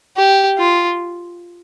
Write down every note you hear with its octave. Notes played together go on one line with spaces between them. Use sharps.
G4
F4